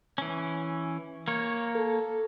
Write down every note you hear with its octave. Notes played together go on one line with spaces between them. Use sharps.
E3 C#4
A#3 C#5
A4